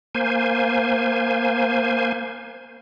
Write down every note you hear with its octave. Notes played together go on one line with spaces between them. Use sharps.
A#3 C5 G#5